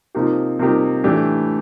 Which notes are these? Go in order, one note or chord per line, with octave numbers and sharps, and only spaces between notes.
C3 F3 A#3 D#4 G4
C3 F3 A#3 D#4 G4
A2 E3 A3 D4 G4